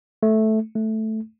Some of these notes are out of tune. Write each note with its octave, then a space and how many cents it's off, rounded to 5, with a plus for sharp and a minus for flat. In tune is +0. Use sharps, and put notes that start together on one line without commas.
A3 -10
A3 -5